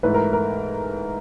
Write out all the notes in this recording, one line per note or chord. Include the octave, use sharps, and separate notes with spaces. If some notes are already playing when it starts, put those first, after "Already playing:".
G#2 E3 A3 B4
A#4
A#4